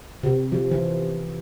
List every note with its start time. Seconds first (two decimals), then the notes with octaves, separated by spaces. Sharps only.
0.23 C3
0.52 F3
0.72 E3